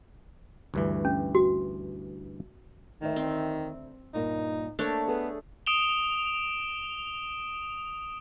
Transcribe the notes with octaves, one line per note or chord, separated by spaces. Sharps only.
D2 G2 E3
C#4
F#4
D2 D#3 B4 E5
C4
G2 A#2 A#3 D#4
A3 A#3 D4 C5 C#5
B3 G#4 A4 B4
D#6 D7 E7 F7 G7